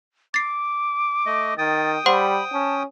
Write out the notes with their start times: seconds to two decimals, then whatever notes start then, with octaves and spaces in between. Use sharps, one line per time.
0.34 D6 A6 C7
1.26 A3 D#5
1.58 D#3 G5 D#6 A6
2.06 G3 C5 F#5 B5 C6
2.53 C#4 A5